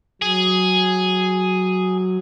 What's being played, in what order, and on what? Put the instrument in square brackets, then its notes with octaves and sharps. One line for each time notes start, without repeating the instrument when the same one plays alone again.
[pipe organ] F#3 [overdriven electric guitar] G#4